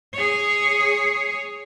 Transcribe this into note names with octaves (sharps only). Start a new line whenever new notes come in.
G#4 C#5